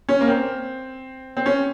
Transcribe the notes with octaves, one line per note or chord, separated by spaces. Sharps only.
C#4
A#3
C4
C4
C#4